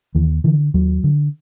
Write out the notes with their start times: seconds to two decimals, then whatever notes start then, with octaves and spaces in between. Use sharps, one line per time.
0.15 D#2 E3
0.44 D3 E3
0.74 D#2 F#3
1.04 D3